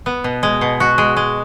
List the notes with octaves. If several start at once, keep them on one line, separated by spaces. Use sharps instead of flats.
B3
B2
G#3
B2
F#4
G#3
G#3